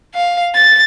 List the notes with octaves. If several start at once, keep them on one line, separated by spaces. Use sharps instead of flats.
F5
A6